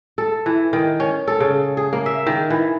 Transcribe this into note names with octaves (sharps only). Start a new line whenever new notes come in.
A4
E3
D#3
C#4
A4
C#3
G#4
A#3
E5
D#3
E3